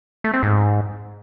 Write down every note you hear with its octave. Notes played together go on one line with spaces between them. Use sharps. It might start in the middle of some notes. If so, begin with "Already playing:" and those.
A3
C4
G#2